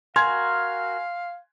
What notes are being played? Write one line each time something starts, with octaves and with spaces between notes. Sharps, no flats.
F#4 A#4 F5 G#5 C6 G#6